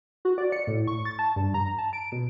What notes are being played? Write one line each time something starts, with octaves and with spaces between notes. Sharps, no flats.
F#4
D5
C#7
A2
C#6
A6
A5
G2
A#5
A5
D7
B2